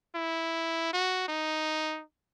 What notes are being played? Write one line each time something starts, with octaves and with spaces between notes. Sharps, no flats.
E4
F#4
D#4